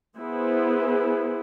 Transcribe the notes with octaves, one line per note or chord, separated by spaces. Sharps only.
B3 E4 G#4 C5